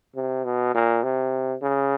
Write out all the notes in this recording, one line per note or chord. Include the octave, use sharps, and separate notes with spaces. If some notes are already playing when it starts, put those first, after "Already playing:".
C3
B2
A#2
C3
C#3